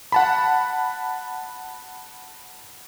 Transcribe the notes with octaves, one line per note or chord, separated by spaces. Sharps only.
F#5 A5 B5